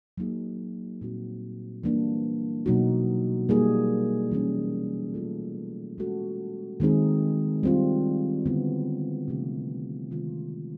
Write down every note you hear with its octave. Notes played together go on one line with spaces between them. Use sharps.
F#3 A#3 D#4 G#4
A#2 G3 C4 D#4 F#4
E3 G3 A#3 D4
B2 F#3 A#3 D#4 F#4
G3 A#3 D#4 G#4
E3 G3 A#3 C#4
A3 C#4 F4 A4
G#3 C#4 F#4 A4
D#3 G#3 C4 D#4 G#4
G3 C4 F4
D3 G3 B3 E4
C3 F3 A3 D4 G4
C3 D#3 G#3 C4 F4